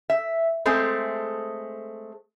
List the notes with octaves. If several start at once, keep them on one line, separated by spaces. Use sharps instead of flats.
E5
G#3 A3 C4 G#4